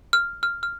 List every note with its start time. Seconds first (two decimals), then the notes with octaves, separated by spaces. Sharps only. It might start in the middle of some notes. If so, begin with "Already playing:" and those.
0.13 F6
0.43 F6
0.63 F6